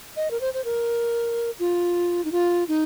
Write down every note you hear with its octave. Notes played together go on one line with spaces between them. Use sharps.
D#5
A#4
C5
C5
A#4
F4
D#4
F4
D#4